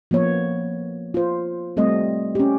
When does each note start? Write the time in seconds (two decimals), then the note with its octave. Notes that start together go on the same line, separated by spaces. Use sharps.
0.11 F3 A#3 B3 C#5
1.14 F4 C5
1.77 G3 A3 C4 D#5
2.35 C#4 G4